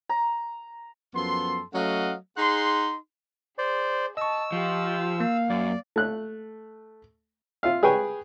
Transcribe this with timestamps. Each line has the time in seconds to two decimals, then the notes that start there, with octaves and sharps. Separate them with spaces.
0.09 A#5
1.14 F#2 F3 B3 A4 C6
1.74 F#3 A3 C#4 D#5 F5 F#5
2.37 D#4 G#4 F#5 C6
3.58 G#4 C5 D5
4.17 D#5 A5 C#6 E6
4.52 F3 F4 G4
5.20 A#3 F5
5.50 F#2 D5
5.96 A3 F#6
7.63 F4 E5 F5
7.83 G#4 B4 C#5 G5 G#5